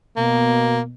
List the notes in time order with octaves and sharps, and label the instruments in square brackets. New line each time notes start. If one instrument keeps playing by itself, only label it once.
[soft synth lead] B2 [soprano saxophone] A#3